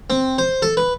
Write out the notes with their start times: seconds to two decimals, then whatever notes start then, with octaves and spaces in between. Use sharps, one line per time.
0.10 C4
0.38 C5
0.62 A4
0.77 B4